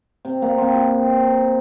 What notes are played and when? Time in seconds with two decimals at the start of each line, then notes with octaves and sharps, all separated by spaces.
0.25 C3
0.42 A#3
0.58 C4
0.75 G4